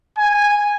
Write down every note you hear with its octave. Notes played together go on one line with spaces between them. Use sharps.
G#5